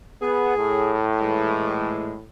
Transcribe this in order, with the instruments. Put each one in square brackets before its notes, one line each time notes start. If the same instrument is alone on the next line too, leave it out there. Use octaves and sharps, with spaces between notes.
[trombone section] B3 [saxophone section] G#4
[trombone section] A2
[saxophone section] A#2 E3 G#3